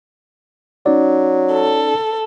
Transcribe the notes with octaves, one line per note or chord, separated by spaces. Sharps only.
F#3 C#4 D#4 D5
A4